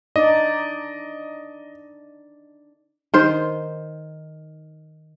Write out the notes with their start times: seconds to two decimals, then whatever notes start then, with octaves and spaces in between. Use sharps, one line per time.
0.16 D4 D#4 D5 D#5
3.14 D#3 C5